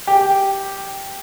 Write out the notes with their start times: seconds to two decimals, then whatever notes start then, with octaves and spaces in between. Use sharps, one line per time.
0.07 G4